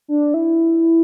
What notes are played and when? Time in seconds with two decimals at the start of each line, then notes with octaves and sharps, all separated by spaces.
0.08 D4
0.34 E4